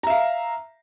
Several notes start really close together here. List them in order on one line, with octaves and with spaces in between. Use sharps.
A#5 E5 F5